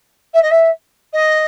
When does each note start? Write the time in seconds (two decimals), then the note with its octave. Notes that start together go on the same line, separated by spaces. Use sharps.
0.34 E5
0.42 D#5
0.51 E5
1.13 D#5